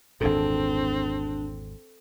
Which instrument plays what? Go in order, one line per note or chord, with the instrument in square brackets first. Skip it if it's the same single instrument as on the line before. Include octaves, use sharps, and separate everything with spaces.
[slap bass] G#1 E2 A#2 [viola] C4 [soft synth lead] D4 [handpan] A4